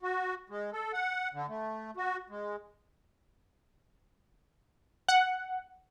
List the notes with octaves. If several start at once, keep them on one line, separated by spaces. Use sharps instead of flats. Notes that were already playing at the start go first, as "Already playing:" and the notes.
F#4
G#3
A4
F#5
D3
A3
F#4
G#3
F#5